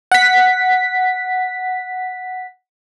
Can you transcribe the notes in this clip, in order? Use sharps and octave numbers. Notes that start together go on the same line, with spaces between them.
F#5 B6